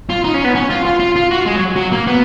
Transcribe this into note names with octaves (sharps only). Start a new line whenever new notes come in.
F4
D#4
C#4
B3
C#4
F4
F4
F4
F4
F#4
G#3
F#3
F#3
A#3
B3